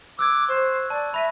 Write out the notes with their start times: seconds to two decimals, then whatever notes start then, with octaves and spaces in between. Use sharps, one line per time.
0.19 D6 E6 F#6 G#6
0.49 C5 C#6 F#6
0.90 D5 A5
1.14 E5 B5 A#6 D#7